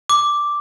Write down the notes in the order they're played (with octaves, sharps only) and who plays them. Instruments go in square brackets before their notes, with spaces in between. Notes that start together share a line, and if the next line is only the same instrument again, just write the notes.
[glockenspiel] D6